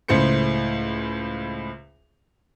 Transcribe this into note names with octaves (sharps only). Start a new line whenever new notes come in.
C#2 A2 C5 C#7